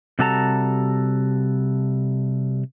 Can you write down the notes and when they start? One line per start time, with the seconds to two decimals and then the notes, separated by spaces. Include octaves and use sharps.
0.19 C3 G3 F#4 A4 A5 A#5